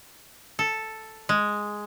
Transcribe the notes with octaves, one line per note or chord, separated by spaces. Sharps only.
A4
G#3